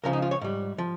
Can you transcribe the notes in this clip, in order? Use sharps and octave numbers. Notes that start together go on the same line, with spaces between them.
C#2 C#3 F3 A#4
D#4
F4
C#5
G#2 G3
F3